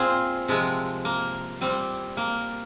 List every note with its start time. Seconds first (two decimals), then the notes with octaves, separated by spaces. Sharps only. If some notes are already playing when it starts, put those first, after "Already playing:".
Already playing: A#2 C4 F4 G#4
0.48 C3 F3 G#3
1.05 A#3
1.61 A#2 G3 C4
2.17 A#3